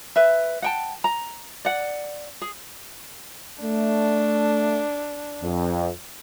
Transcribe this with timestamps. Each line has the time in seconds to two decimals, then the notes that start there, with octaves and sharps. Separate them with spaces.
0.16 B4 E5
0.62 F#5 G5 A5
1.04 A#5
1.65 D5 F#5
2.42 G#4
3.61 A3 D4
5.42 F2